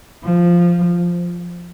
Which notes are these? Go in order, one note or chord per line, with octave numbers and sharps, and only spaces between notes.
F3